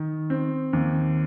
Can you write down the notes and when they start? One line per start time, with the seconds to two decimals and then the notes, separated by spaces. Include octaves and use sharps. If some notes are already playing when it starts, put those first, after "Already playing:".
Already playing: D#3
0.30 C4
0.73 D#2